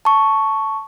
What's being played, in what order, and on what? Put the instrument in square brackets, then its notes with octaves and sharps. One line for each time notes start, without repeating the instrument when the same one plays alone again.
[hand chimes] A5 C#6